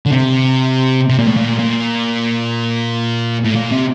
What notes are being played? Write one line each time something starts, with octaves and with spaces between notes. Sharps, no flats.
D3
C3
C3
A#2
A2
A#2
A#2
A2
A#2
C3